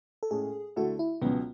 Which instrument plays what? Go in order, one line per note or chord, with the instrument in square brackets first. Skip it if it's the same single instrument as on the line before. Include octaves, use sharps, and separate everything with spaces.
[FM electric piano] A4
[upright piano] A2 G#3 C#4 [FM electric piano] G#4
[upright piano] D2 D3 A3 E4 A4 [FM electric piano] F#4
[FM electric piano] E4
[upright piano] C#2 B2 F#3 C#4 [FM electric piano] B3